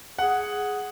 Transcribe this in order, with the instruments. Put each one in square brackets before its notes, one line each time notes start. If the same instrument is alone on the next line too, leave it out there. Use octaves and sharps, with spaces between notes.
[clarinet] G#4 [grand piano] F#5